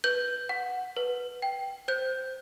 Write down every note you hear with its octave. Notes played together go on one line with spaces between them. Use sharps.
B4 G6
F#5
B4
G5
C5 G6